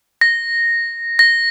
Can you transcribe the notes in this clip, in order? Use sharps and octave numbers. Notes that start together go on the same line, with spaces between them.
A#6
A#6